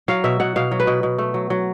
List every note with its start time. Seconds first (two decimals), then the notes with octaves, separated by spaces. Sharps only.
0.08 F#3 F5
0.24 B2 E5
0.40 B2 F#5
0.56 B2 F5
0.72 F#3
0.80 B4
0.87 B2
1.03 B2
1.18 A3
1.34 F#3
1.50 F#3